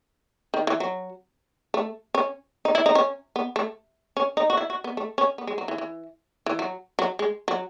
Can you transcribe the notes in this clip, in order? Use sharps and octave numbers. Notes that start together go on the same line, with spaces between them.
D#3
E3
F#3
A3
C#4
D#4
E4
D#4
C#4
B3
A3
C#4
D#4
F#4
E4
F#4
B3
A3
C#4
B3
G#3
F#3
E3
E3
E3
F#3
F#3
G#3
F#3